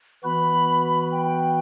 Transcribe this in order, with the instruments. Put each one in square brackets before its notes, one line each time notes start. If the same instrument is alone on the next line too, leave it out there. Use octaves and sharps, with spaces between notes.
[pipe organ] E3 B3 F#4 B4 [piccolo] B5
[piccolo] G5